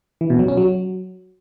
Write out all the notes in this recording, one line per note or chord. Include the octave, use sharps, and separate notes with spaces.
E3
B2
F#3
C#4
F#3